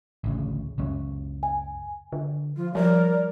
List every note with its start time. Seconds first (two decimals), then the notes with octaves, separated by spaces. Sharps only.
0.24 A1 D2 C#3
0.78 C#2 F#2 C#4
1.43 G#5
2.13 D3
2.57 F3 F4
2.75 F3 G3 A#4 D5